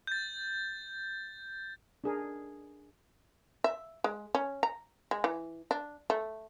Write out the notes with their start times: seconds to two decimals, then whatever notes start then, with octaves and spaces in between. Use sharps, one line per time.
0.07 G6 A6
2.04 D4 G#4 A#4
3.64 E5
4.04 G#3
4.35 C#4
4.63 A#5
5.11 G#3
5.24 E3
5.71 D4
6.10 A3